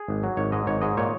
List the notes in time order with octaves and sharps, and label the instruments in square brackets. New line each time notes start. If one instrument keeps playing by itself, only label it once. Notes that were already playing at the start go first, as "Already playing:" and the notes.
Already playing: [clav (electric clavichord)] G#4
G#1
F#3
G#1 C#5
G#2 D#5
G#1 C#5
G#2 D#5
A#2 C#5